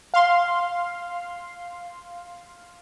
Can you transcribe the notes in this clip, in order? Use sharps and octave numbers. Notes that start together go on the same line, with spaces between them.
F5 C6